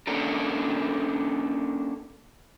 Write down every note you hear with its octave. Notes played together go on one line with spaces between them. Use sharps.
A#3 C#4 D4 A4 A#4